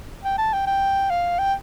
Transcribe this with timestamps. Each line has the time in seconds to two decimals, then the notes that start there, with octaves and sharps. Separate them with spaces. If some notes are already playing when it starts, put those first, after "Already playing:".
0.24 G5
0.38 A5
0.53 G5
0.67 G5
1.10 F5
1.39 G5